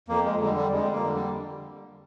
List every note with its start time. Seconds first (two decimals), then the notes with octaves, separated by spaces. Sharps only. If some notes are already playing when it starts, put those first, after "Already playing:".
0.09 F2 A#3
0.24 G#3
0.40 D3 G3 G#3
0.57 G3
0.72 F2 G#3
0.93 A#3
1.04 D3 G3
1.15 G3